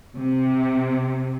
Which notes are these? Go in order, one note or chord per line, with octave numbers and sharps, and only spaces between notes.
C3